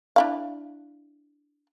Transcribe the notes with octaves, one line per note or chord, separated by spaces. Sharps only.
D4 E4 F5